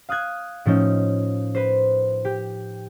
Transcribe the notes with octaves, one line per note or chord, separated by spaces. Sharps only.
F5 D#6 F#6 G#6
A2 F3 C#4 D#4
B4 C5
G4